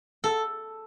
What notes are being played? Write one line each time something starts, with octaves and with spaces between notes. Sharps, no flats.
A4